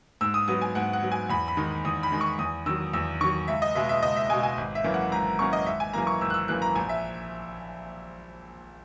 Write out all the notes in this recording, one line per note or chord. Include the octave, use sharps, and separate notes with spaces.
G#2 E6
D#6
F#3 B3 D#6
G#5
G#2 F#5
F#5
F#3 B3
G#5
E2 B5
B5
D#3 G#3 D#4
E2 D#6
B5
D#3 G#3 D#4
C#6
E2 D#6
D#3 F#3 E6
E2 E6
D#3 F#3 C#6
C#2 E5
D#5
B2 G#3 E5
E5
C#2 D#5
E5
B2 G#3 G#5
G#5
G#1
E5
F#2 E3 A#3 C#4
F#5
G#1 A#5
F#2 E3 A#3 C#4 C#6
D#5
G#1 E5
G#5
F#2 E3 A#3 A#5
C#6
G#1 E6
F#6
E6
F#2 E3 A#3 F#6
A#5
A#1 G#5
E5